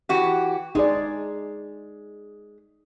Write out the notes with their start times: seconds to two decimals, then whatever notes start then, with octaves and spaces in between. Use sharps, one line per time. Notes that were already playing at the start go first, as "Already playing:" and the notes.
0.09 E3 F#4 G4
0.75 G#3 D#4 G#4 D5